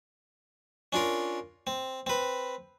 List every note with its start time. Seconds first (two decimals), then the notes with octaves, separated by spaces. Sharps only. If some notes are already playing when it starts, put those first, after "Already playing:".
0.93 C#4 D4 F4 A#4
1.67 C4
2.07 C4 B4